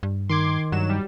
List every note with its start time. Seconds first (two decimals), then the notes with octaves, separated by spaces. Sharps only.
0.03 G2
0.29 D#3 C6 D6 G#6
0.72 G2 F#3 E7
0.89 G3